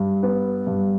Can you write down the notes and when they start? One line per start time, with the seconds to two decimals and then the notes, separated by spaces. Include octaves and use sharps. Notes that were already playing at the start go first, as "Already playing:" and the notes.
Already playing: G2
0.23 B3
0.67 G2